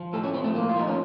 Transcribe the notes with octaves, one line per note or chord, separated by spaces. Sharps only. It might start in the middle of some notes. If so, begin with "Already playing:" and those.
Already playing: F3
A2 A4
C#4
F3 C4
A3
A2 A#3
F4
F3 D#4
C#4